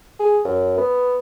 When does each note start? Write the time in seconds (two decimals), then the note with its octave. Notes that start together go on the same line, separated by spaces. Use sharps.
0.19 G#4
0.45 F#2
0.78 B3